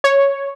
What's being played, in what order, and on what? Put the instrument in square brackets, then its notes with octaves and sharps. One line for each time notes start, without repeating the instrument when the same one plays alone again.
[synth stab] C#5